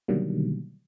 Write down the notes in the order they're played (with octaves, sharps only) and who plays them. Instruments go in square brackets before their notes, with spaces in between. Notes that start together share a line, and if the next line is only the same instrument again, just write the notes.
[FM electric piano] B2 D3 D#3 F#3 G3 A#3